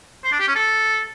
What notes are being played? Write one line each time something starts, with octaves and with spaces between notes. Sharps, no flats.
C5
D4
G4
C#4
A4